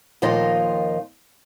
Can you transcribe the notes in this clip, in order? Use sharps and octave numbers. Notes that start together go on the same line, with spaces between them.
D#2 A#2 F3 D#4 F4 D#5